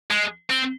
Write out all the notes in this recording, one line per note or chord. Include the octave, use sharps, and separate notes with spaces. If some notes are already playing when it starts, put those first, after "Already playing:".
G#3
C4